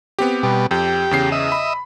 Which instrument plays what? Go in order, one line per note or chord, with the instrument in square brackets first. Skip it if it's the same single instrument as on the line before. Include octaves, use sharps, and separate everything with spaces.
[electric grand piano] B3 C4 G4
[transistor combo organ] B2 G3
[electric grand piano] F2 [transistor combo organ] G4
[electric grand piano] E2 C#3 C7
[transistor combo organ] D#5 E5
[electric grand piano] B5